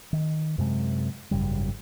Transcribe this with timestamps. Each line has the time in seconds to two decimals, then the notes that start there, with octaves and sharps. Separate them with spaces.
0.13 D#3
0.58 F#2 C3 G#3
1.31 G#1 F#2 C#3 G3